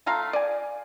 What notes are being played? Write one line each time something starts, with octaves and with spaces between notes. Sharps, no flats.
A3 F4 F5 A#5
D5 G#5